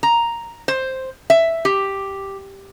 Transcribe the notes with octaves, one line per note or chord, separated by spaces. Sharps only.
A#5
C5
E5
G4